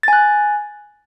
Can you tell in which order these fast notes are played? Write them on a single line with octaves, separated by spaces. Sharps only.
A6 G#5 F#6